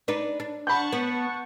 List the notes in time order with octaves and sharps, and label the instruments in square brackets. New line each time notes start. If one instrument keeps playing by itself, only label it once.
[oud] D4 D#4 B4
D4
[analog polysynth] F#5 A5 C#6 [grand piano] B5 G6
[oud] B3